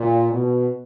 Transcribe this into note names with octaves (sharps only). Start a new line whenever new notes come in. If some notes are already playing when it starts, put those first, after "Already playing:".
Already playing: A#2
B2